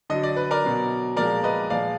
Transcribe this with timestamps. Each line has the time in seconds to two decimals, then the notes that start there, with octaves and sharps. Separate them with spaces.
0.10 D3 F#3 D#5
0.23 D5
0.37 B4
0.51 A#4 D5
0.64 B2 F#3
1.16 A#2 F3 G#3 A#4 D5
1.44 B4 D#5
1.70 A#2 F3 G#3 D5 F5